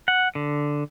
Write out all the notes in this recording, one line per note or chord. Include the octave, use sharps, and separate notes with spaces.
F#5
D3